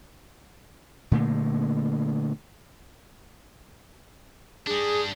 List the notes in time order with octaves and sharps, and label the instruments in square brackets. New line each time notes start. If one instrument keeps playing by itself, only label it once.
[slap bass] A#2 D3 A3 A#3
[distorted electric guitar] G3 D4 [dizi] G#4